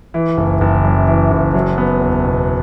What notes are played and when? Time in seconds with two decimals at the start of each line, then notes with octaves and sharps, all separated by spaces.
0.14 E3
0.38 F#1
0.61 F#1
0.84 F#2
1.08 E3
1.31 F#1
1.54 F#3
1.78 B3
2.01 E2
2.24 B2